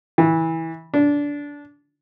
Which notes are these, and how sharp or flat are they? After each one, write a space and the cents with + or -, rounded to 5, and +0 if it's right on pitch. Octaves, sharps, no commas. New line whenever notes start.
E3 -20
D4 -20